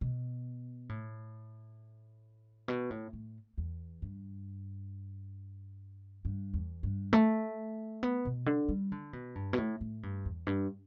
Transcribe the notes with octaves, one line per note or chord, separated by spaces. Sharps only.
B2
A2
B2
A2
A2
E2
G2
G2
E2
G2
A3
B3
B2
D3
G3
D3
B2
G2
B2
A2
A2
G2
E2
G2